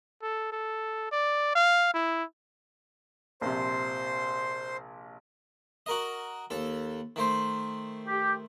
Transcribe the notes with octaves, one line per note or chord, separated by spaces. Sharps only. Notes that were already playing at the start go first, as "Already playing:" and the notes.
A4
A4
D5
F5
E4
A#1 C3 C5 C6
F#4 A#4 D#5
D#2 A4
D#3 A3 C5
G4